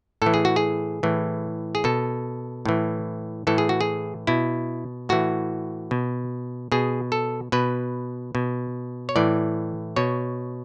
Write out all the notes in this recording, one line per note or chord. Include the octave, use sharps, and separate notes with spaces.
A2 E3 A4
G#4
F#4
G#4
A2 E3
G#4
B2 A4
A2 E3
A2 E3 A4
G#4
F#4
G#4
B2 E4
A2 E3 F#4
B2
B2 G#4
A4
B2 B4
B2
C#5
A2 E3 D5
B2 C#5